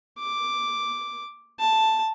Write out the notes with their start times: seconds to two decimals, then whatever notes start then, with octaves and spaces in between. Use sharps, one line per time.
0.19 D6
1.60 A5